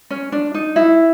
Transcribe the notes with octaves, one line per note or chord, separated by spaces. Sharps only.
C#4
D4
D#4
E4